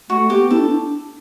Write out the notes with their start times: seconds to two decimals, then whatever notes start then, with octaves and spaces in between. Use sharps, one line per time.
0.09 A3 F#4
0.30 B3 G4
0.51 E4 A4
0.58 D4